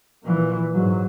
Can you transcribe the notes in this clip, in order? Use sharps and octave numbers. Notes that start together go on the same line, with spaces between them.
A#2 E3
G#2 F#3